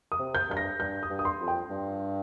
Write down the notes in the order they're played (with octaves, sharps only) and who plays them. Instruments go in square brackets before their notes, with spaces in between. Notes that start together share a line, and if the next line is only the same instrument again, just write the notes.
[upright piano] D#6
[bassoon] C3
[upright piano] G6
[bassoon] G2 [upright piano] G6
[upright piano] A#6
[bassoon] G2 [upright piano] G6
[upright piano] D#6
[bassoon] G2
[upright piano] D#6
C6
[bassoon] F2
[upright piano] G5
[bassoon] G2